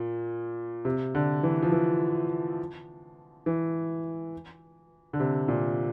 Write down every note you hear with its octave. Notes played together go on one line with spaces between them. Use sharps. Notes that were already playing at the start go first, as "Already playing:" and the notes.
Already playing: A#2
C3
D3
E3
F3
E3
E3
D3
C3
A#2